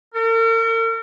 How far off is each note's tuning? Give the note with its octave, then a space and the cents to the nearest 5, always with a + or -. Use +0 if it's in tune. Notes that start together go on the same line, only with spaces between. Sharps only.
A#4 -45